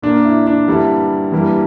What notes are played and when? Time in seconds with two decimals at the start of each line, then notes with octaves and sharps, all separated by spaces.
0.02 A#2 A#3 D4
0.25 E4
0.47 D4
0.68 G2 D3 G3 A#3 E4
1.32 G2 E3 G3 A#3